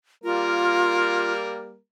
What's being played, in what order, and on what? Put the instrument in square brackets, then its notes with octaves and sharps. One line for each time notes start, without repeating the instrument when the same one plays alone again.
[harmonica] G3 A#3 A#4 [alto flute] F4